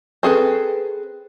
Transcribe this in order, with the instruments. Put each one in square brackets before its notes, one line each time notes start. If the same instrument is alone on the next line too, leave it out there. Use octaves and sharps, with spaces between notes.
[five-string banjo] C4 G#4 A4 B4